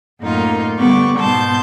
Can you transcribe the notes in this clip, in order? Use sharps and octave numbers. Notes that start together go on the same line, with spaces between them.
F#2 A2 A#3 D#4 F4
D3 G3 B3 C#6 D6
G#2 B2 A5 C6 G6